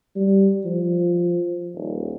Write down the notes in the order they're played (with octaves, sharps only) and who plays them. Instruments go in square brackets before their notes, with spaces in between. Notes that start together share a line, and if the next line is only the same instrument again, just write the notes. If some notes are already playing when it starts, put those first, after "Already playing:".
[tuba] G3
F3
D#1